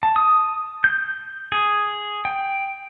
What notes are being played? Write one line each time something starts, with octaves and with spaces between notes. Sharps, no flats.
A5
D#6
G6
G#4
G5